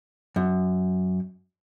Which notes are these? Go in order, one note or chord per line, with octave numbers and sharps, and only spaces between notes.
F#2